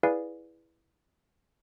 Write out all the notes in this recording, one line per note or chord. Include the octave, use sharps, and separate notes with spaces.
E4 G#4 B4 D5 F5 G#5